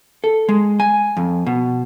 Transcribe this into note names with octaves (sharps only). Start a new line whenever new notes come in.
A4
G#3
G#5
F2
B2